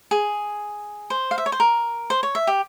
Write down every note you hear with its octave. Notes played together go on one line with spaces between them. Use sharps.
G#4
C5
F5
E5
C#5
C5
A#4
C5
C#5
E5
G4